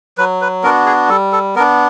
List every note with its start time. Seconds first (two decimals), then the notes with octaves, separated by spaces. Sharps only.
0.18 F#3 B4
0.41 B4
0.63 B3 D4 F#4 A#4
0.86 G#4
1.09 G3 A4
1.32 A4
1.56 B3 A#4
1.59 D4